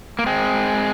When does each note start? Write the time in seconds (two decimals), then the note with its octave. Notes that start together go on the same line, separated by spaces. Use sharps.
0.19 A#3
0.26 G#3 C4